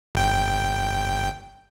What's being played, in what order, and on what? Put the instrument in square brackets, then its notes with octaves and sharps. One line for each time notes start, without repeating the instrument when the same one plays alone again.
[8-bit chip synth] G1 G5